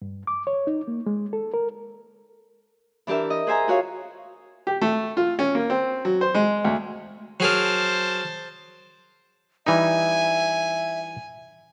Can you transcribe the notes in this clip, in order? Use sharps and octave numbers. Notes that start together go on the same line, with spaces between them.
G2
D6
C#5
D#4
A#3
G#3
A4
A#4
E3 D4 G4 A#4 E5
D#5
G#4 C5 E5 G#5 A#5
F4 F#4 C#5 F5
G4
A3
F4
C#4
A#3
C4
F#3
C5
G#3
D2
F#3 G#4 A#4 C5 A5
E3 G3 D#4 E5 G#5